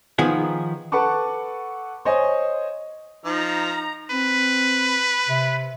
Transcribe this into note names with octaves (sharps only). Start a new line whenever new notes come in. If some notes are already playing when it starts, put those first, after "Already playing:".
D#3 F3 B3 G#4
A4 B4 F#5 A5 C#6 D6
C5 C#5 D#5 G#5
F3 D#4 A#5
C4 B4
C3